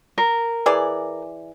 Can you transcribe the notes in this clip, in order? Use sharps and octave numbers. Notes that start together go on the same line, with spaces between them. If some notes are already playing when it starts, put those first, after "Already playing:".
A#4
E3 G#4 D5